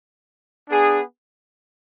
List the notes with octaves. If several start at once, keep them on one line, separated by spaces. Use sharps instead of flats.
B3 D4 G#4